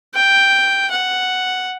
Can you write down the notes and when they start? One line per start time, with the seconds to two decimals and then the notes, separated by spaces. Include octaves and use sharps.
0.15 G5
0.91 F#5